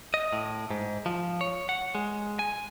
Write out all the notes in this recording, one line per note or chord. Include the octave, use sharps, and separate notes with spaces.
D#5
A2
G#2
F3
C#5
F#5
G#3
G#5